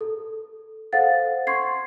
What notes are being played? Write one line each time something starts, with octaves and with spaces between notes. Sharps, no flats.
A4
A4 C5 F5 F#5 A6
C6 C#6 G#6 C7